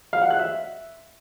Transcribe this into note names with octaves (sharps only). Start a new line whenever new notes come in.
F5
F#5
F#6
E5